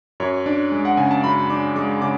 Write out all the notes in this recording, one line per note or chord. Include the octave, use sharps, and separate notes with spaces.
F#2 C#5
D4 D5
G#3
F#5
C#3 G#5
A5
F#2 B5
D4 D6
G#3 D6
C#3 D6